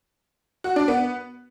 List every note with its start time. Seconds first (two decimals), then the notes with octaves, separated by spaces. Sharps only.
0.64 F#4
0.76 D4
0.88 B3